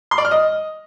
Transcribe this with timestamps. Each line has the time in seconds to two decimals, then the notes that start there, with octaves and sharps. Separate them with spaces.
0.11 C6
0.18 D5
0.25 F6
0.31 D#5